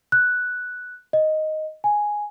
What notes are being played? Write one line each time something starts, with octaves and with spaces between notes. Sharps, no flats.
F#6
D#5
G#5